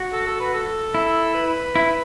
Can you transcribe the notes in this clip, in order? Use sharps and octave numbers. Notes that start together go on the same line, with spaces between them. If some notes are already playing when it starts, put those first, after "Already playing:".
Already playing: F#4
A4
A4
B4
A4
E4
B4
E4